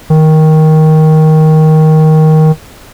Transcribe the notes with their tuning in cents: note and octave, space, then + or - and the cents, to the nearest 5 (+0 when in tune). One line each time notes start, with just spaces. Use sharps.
D#3 +10